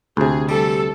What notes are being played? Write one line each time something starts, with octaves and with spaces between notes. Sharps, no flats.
D2 C3 G#4
G3 A4